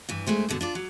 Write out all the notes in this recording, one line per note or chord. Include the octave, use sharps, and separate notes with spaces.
G2 E3
G2 G#3 A3 C5
G2 B2 D3
D4 F4 D5
F#3